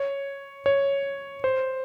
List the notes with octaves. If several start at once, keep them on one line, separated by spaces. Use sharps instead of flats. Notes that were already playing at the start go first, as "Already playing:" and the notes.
Already playing: C#5
C#5
C5